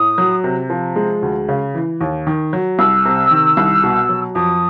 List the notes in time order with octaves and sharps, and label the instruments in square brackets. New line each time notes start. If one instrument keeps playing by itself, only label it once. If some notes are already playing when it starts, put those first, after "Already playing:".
Already playing: [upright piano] A2 [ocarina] D#6
[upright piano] F#3
C3
F3
G#3
D2
C#3
E3
D#2
D#3
F#3
[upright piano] C2 [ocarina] E6
[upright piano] C3
D#3
C2
B2
F#3
[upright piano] F2 [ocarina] D#6